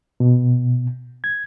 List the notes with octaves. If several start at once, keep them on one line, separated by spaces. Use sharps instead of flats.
B2
G#6